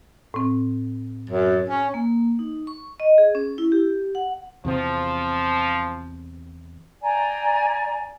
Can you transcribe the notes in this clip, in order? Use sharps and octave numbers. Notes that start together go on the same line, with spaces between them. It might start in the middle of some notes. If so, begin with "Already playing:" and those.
A2 C4
F#2
C#4
A#3
D#4
C#6
D#5
G#4
C#4
E4
G4
F#5
E2 C3 F3 C4
D5 G5 G#5 A#5